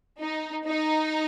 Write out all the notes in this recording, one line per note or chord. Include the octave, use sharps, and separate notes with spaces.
D#4
D#4